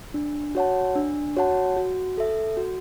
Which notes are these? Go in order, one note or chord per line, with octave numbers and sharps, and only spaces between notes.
D4
F#4 C#5 F#5 A5
D4
F#4 C#5 F#5 A5
F#4
A4 E5
F#4